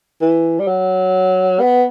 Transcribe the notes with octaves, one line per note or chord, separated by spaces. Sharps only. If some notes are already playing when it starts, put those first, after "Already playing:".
E3
G3
F#3
B3